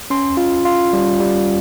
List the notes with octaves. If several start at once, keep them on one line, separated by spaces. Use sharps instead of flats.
C#4 C6
F4
F4
G3
G3